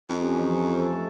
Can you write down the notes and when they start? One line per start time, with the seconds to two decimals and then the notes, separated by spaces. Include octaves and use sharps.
0.10 F2 D#4
0.22 C#4 G4
0.37 E3 C#4 D#4
0.50 F3
0.79 A4
0.93 A3